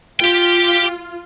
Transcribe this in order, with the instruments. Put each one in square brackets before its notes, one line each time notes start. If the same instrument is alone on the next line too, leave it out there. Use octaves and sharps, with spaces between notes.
[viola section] F4 [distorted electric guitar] G4 G5